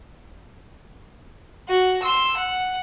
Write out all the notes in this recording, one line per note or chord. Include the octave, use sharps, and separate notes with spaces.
F#4
C6 E6
F#5